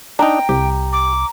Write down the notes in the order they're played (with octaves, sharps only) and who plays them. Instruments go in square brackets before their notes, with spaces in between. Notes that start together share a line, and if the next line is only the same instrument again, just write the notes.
[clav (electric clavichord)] D4 D#4 [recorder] G5 [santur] A#5
[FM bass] C2 [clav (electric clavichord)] G4
[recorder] D6